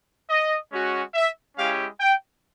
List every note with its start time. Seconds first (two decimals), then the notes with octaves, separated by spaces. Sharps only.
0.30 D#5
0.72 G#3 C#4 F#4
1.14 E5
1.56 G#3 C#4 E4 G4 F5
2.00 G5